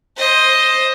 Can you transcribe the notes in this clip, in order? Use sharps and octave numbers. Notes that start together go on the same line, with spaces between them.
C5 D#5